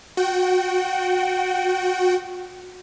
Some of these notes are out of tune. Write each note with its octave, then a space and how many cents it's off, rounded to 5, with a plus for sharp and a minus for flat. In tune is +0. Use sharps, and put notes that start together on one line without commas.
F#4 -20 G5 -30